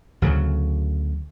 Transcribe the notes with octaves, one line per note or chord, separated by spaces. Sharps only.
D2 C#3 F3 F#3